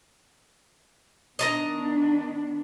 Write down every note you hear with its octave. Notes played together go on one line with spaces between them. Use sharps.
D#3 B3 D4 D#5 A5 A#5